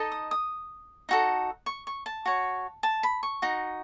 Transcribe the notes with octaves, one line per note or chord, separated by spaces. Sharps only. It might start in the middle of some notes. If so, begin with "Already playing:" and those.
Already playing: D#4 A4 D#5
D#6
D#6
D#4 F#4 A4
C#6
C#6
A5
F#4 C#5
A5
B5
C#6
D#4 F#4